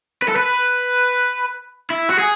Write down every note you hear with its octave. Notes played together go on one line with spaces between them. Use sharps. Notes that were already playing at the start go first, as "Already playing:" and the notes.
B4
A4
B4
E4
F#4
G#4